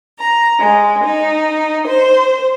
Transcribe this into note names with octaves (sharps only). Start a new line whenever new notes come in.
A#5
G#3
D#4
C5